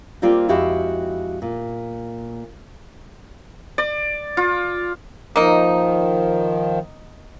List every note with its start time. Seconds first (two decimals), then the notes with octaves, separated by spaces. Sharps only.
0.22 G3 A#3 C4 F4 G4 D5
0.48 F2 G#3 E4 F#4 G4 F5
1.42 A#2
3.78 D5
4.37 F4
5.36 D#3 F3 A#3 D#4